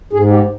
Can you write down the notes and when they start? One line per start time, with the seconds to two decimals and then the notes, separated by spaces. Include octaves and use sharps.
0.13 G#2 G#4
0.30 G4